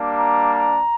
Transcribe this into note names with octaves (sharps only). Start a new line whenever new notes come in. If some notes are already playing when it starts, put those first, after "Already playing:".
Already playing: G3 A#3 D4
A#5
A#5